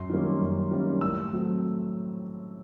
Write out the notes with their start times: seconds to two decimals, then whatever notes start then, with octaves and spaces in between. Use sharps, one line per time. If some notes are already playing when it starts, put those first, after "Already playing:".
Already playing: F#2 C6
0.09 D#3 G3 A#3 C#4
0.41 F#2
0.71 D#3 G3 A#3 C#4
1.01 A2 E6
1.33 F#3 A3 C4